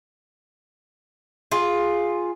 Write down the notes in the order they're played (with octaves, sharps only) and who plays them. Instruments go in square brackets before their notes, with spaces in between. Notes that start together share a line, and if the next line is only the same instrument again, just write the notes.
[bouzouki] F4 G#4